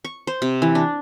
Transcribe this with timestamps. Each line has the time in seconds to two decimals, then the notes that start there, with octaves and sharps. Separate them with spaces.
0.05 C#6
0.27 C5
0.42 C3
0.62 E3
0.75 D4